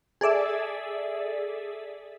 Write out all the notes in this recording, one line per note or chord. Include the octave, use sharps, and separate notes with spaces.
G#4 A4 D5 E5